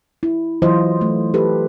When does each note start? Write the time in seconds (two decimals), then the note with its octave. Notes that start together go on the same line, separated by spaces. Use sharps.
0.23 E4
0.62 E3 F#3 E4 F4 C5 D#5
1.01 A3
1.34 G4 A4 B4